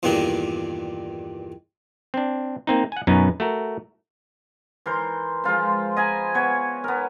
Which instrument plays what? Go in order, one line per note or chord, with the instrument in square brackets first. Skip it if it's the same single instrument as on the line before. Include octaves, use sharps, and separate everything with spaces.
[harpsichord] E2 G2 A#2 D#3 D4
[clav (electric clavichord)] C4 D4
A#3 C4 D#4
F#5 G#5
F#2 B2 F#3 B3 C#4 D#4
A3 F#4 A#4
[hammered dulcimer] E3 A#4 C5
F3 G#3 F4 C5
D#5 G#5 A#5 B5
B3 C#5 G#5
B3 A#4